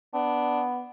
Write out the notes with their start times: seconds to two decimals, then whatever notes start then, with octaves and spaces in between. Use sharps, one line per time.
0.14 B3 D4